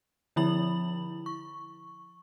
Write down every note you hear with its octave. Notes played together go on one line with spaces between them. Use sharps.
D3 F3 E4 B5 F#7
C#6